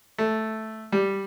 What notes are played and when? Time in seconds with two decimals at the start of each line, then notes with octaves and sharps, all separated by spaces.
0.18 A3
0.92 G3